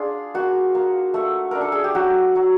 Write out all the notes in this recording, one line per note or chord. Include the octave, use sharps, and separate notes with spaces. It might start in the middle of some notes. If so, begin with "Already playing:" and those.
Already playing: D4 F4 G#4
A#3 F#4
A#3
A3
D4 A#4
A4
G#4
G4
F#3 F#4
F#3